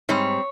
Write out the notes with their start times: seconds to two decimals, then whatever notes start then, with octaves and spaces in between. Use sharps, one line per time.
0.09 G#2 G3 C4 C#5